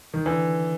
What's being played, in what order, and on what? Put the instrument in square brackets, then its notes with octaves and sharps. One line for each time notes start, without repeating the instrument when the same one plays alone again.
[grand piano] D#3
D3 E3